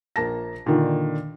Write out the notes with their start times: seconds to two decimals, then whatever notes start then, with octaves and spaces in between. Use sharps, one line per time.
0.16 A#1 A#3 A5 A#6
0.66 A#2 D3 D#3